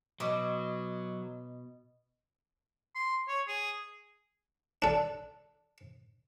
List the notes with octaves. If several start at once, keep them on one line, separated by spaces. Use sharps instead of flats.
B2 F#3 D#5 D6
C6
C#5
G#4
D4 A4